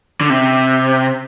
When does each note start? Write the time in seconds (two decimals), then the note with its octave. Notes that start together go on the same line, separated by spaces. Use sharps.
0.21 D3
0.30 C3